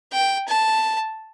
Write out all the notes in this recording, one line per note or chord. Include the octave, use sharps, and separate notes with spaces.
G5
A5